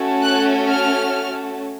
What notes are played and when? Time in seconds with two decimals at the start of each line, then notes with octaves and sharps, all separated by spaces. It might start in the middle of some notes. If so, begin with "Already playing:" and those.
Already playing: A3 C#4 F#4 A4
0.23 F#6
0.69 F6